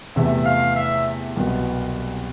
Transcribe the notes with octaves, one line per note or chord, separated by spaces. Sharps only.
E2 C3 E3 A3 E5
F5
E5
C2 B2 F#3